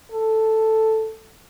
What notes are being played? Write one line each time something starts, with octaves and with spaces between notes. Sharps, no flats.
A4